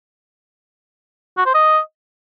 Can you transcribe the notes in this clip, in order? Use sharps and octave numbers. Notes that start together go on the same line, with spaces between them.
F#4
C5
D#5